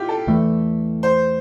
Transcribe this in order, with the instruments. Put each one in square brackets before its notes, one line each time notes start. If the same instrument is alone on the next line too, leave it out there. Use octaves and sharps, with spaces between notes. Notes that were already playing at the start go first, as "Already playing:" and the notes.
Already playing: [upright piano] E4 F4 G4
A4
[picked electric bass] E2 E3 A3
[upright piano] C5